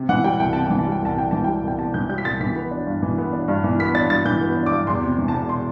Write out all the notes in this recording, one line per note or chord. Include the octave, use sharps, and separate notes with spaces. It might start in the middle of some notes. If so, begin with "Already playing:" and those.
Already playing: C3
E3 F#5
G3 G5
C2 G5
C3 A5
E3 G5
A5
G3
G5
C2 A5
C3 G5
E3 A5
G3 G5
C2 G5
C3 A5
E3 G6
G3 G6
B6
C2 A6
E3 B6
B3
D4
G2
E3
B3
D4
G2
E3
B3 B6
D4 A6
G2 A6
E3 G6
B3
D4
D6
G2
E2 C6
C3
E3
A5
E1
C6